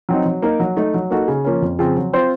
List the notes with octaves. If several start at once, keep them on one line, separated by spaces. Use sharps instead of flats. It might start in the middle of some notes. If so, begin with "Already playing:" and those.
F#3 C4 D#4
F#3
A#3 D#4 A#4
F#3
A3 D#4
F#3
A#3 D#4 F#4 A4
C#3
F3 A#3 C#4
F2
C#3 F3 C4
F#3
C4 F4 C5